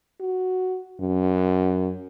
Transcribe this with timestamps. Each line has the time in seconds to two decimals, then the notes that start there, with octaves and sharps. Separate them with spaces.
0.21 F#4
1.00 F#2